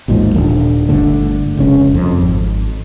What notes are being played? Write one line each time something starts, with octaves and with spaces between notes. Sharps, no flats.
A1 D#2 G#2 F3
D#1 D3
G1 D3 A3
F1 C#2 C#4
F2
G#1